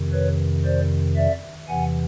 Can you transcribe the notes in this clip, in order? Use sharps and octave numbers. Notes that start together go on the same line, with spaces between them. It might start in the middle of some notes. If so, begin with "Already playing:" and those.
Already playing: F2 C3 D#3
B4 C#5
C5 D5
D5 E5
E2 C3 E3 F#5 G#5